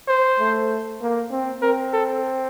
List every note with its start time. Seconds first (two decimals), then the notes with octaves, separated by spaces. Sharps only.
0.08 C5
0.39 A3
1.01 A#3
1.31 C4
1.62 C4 A#4
1.94 A4